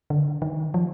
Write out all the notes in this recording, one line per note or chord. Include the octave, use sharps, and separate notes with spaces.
D3
D#3
F3